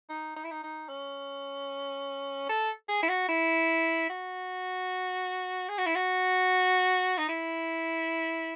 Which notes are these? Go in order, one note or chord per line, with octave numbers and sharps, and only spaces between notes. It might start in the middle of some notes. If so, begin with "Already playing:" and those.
D#4
D#4
E4
D#4
D#4
C#4
A4
G#4
E4
F#4
E4
F#4
G#4
F#4
E4
F#4
D#4
E4